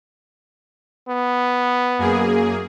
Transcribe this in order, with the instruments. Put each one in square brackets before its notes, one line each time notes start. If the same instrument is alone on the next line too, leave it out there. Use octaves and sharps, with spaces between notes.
[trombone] B3
[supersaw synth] F#2 A#3 G#4